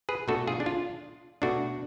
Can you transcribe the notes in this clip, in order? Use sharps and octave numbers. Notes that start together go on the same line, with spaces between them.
G#4 B4
B2 A3 D4 F#4 A4
F4 G#4
D4
F4
B2 A3 D4 F#4